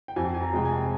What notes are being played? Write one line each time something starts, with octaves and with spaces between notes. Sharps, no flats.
G5
F2 G#5
G#5
A#5
C3 F3 G#3 G5
G#5